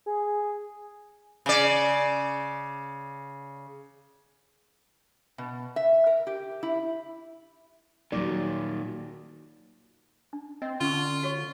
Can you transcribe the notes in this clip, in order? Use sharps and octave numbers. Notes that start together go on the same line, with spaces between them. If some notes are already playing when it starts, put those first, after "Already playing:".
G#4
C#3 D5
B2
E5
A#4
G4
E4
A#2 D#3 F#3 D5
D4
C4 D#5
D3 C#4 F4 C#6
F#4 C#5 C#6